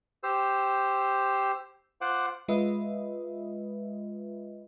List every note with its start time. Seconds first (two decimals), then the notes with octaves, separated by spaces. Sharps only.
0.23 G4 C5 E6
2.01 F4 C5 F#5 D6
2.48 G#3 F4 B4 D#5 E5